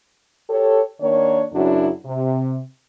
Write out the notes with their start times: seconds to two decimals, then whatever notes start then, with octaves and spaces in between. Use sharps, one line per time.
0.50 G4 A4 C#5
1.01 D#3 A#3 D4 C#5
1.53 F#2 C#3 F#3 D4 E4 F#4
2.06 C3